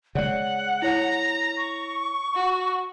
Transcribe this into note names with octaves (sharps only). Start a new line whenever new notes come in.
C#3 G#3 C#5 D5 F#5
E4 C#5 A#5
C#6
F#4